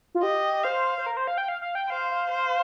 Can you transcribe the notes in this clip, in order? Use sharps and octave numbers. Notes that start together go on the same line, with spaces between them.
F4
G4 D#5
C5 F5
C5
A#4
C5
F5
G5
F5
F5
G5
C5 F5
F5
C5